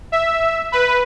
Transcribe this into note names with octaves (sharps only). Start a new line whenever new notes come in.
E5
B4